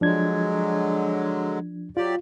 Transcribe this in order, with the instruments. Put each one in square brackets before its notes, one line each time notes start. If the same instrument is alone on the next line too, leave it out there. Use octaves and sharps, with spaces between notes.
[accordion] D3 F#3 G#3 [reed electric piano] F3 D4 G#6
[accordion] F#3 G4 D5 [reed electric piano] F4